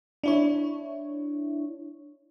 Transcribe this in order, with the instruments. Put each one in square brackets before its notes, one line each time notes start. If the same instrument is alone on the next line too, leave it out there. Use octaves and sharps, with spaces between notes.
[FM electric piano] D4 E4 C#5